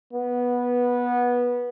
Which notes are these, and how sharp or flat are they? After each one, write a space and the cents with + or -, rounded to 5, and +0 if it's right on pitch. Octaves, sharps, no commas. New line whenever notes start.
B3 -15